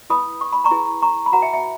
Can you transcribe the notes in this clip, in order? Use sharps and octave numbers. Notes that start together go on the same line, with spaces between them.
E4 B4 B5 D#6
C#6
B5
A#5 C#6
E4 G#4 B4
A#5 C#6
B5
F#4 B4 F#5 A#5
E5 G#5
E5 G#5